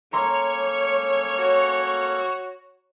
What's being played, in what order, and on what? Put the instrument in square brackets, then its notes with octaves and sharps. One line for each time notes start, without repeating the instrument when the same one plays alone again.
[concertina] A#3 C#4 A4 [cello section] C#5 [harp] A#5 C6
[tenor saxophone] F#4